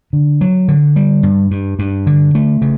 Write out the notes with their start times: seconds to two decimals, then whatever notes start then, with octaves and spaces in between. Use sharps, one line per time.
0.13 D3
0.41 F#3
0.68 D3
0.96 G3
1.23 G2
1.51 G2
1.79 G2
2.07 D3
2.35 A3
2.62 C#3